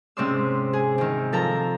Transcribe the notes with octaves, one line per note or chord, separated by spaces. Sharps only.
G#2 C3 C#4 D5 C6 E6
G#4
C3 D#3
F3 A4 A#4 A5 A#5